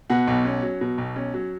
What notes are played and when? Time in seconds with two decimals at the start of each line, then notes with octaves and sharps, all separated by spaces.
0.10 B2 F#5
0.27 B1
0.45 C#4
0.62 F#3
0.81 B2
0.98 B1
1.16 C#4
1.34 F#3